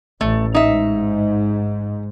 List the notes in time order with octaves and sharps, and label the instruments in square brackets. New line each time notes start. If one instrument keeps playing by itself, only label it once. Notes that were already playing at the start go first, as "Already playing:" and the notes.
[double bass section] A1 [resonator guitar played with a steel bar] A3
[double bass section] G#2 [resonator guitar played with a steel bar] D#4 E5